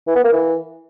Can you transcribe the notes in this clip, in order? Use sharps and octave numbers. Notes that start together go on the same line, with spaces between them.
E3
B3
A#3
E3